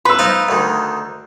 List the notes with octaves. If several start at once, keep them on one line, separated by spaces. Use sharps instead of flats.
B4 C6 E6
D#4 F4 C5
D2 D#3